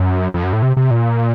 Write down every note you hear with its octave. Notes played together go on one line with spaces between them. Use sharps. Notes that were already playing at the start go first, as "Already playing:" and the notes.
Already playing: F#2
F2
F#2
A2
C3
C3
A#2